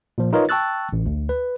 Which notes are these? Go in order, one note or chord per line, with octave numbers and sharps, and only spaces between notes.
A#2 F3
D#4 F4 A#4 B4 C#5 D#5
G5 A5 C#6 E6 F#6 A6
A1
D2
B4